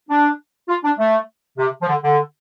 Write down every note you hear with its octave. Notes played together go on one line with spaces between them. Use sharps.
D4
F4
D4
A3
C3
F3
D3
D3